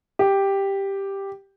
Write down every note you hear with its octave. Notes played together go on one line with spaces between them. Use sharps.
G4